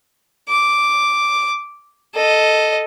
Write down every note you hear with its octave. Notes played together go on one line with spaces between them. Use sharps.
D6
A4 D#5